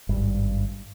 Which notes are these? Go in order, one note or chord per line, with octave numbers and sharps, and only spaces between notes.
G#1 G2